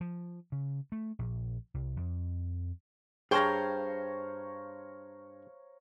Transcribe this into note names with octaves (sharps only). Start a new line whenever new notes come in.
F3
C#3
A3
A#1
C2
F2
G2 G#4 C5 C#5 F5 G5 A5 A#5